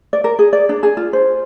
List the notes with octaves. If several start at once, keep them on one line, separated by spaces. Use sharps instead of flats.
D5
A#4
G#4
D5
D4
G#4
F4
C5